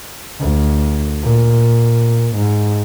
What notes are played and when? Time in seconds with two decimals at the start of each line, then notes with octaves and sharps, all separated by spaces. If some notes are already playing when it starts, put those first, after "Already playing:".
0.40 D2
1.23 A#2
2.37 G#2